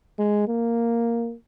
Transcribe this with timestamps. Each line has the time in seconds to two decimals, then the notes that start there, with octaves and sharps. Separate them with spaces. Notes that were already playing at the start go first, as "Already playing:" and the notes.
0.19 G#3
0.48 A#3